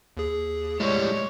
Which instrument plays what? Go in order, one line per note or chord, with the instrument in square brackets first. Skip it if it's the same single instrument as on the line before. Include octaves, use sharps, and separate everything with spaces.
[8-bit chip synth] D#2 G#4
[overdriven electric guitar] A2 G3 [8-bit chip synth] G#3 [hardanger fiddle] C#5